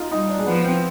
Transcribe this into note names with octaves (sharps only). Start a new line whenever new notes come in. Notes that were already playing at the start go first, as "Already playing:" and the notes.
Already playing: D#4 F4
G3 D#4
D4
G#3
F3 B3
C4
F4